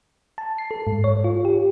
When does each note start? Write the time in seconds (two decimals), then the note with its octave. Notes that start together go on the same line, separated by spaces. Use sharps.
0.38 A5
0.58 C7
0.71 A4
0.87 G#2
1.04 C#5
1.24 F4
1.45 G4